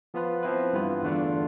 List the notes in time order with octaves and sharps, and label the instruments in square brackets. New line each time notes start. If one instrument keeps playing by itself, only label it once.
[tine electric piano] F3 B3 F4 B4
F3 C4 E4 B4
G2 E3 B3 F4 B4
E2 D3 A3 D4 F4